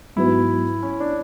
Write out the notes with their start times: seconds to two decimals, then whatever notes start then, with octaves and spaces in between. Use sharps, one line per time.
0.16 G#2 F#3 B3 E4 F#4 B4
0.83 C#4
1.00 D4